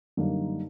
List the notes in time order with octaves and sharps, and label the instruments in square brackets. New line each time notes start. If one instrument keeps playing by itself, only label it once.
[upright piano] F#2 D3 G3 A#3 D#4